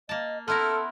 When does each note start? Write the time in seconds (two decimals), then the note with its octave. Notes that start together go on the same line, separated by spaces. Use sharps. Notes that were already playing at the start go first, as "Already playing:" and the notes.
0.09 A#3 D#5 A5
0.48 B3 E4 A4 A#4 C6 F6